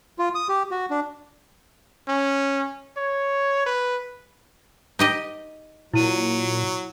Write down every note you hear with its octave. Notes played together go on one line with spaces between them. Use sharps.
F4
D#6
G4
F#4
D4
C#4
C#5
B4
D#4 G4 D#5
A#2 F#3 E4 D#7